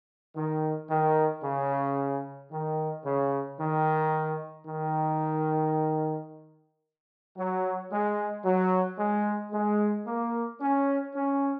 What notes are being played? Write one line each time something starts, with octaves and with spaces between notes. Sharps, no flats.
D#3
D#3
C#3
D#3
C#3
D#3
D#3
F#3
G#3
F#3
G#3
G#3
A#3
C#4
C#4